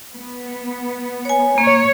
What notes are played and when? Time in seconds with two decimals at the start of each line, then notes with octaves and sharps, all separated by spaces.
0.13 B3
1.25 C#5 G#5
1.58 A#3 C#5